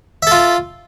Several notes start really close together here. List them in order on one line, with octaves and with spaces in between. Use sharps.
E5 A4 F4